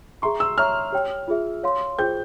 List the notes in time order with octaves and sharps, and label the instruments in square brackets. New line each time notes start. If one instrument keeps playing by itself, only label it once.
[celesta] G#4 E5 A#5 C#6 [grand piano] C6
[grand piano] E6
[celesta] C#5 E5 A#5 C#6 [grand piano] F6
[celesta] G4 C#5 G5
F4 G#4 E5
C#5 F5 C6
[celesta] F4 G#4 C5 G5 [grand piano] G6